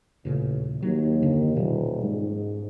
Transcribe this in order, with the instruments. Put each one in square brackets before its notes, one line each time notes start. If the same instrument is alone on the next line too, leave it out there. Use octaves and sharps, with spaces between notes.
[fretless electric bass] D#1 A#2 C#3 [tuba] A1
[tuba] D#2 [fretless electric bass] F#3
[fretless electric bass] F#2 D3 D4
[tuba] D#1 [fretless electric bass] B2 F#3 G3
[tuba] G#2